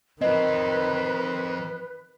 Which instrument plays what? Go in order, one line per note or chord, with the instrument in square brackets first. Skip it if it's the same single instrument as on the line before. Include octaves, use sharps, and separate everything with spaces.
[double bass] D#3 [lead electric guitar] F3 C4 [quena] B4 [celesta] D#5